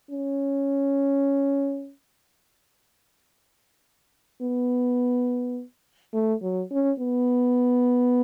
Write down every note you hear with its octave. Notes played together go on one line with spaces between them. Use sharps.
C#4
B3
A3
F#3
C#4
B3